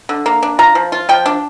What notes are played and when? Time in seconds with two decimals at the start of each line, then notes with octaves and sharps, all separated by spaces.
0.09 D3
0.26 A#3
0.43 D4
0.59 F4 A#5
0.75 F3
0.92 F4
1.09 F3 G5
1.26 D4